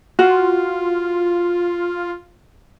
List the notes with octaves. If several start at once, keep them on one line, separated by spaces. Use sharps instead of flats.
F4 F#4